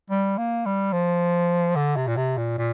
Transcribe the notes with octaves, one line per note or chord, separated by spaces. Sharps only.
G3
A#3
G3
F3
D3
C3
A#2
C3
A#2
A#2